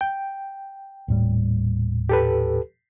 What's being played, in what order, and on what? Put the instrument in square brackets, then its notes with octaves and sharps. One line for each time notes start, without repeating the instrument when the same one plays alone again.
[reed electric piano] G5
[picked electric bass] D#1 A2 G3
[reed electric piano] G4 A4 B4